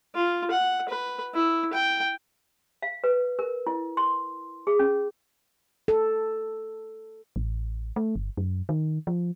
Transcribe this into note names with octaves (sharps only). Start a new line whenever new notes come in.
F4
F#5
B4
E4
G5
F5
B4
A#4
E4
C6
G#4
C#4
A4
A1
A3
G1
F#2
D#3
F3